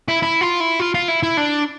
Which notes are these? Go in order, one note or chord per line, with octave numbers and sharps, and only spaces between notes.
E4
E4
F4
E4
F4
F4
E4
E4
D4